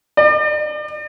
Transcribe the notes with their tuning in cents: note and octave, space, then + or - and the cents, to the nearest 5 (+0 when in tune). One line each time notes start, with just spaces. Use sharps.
D5 +40